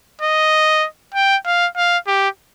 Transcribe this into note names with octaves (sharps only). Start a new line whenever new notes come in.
D#5
G5
F5
F5
G4